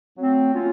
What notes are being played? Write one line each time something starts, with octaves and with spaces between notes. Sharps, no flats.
F#3 A3 C4
F#3 A#3 C#4 F4